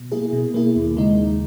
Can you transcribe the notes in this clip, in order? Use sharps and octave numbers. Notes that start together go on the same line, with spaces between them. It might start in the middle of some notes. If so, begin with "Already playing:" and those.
Already playing: B2
A#3 E4 G#4
B2
A#3 E4 G#4
D#2
C#3 G#3 D#4
D#2